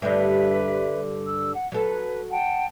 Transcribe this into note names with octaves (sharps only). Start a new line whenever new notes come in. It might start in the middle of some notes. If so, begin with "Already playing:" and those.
G2 D3 B4 E5
E6
F#5
F#3 A4 B4
F#5 G5 A5